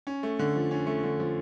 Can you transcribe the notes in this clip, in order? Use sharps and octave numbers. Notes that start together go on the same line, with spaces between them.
C#4
A3
D3
F3
C#4
A3
D3
F3